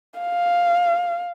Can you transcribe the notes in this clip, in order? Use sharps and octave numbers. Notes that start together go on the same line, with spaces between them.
F5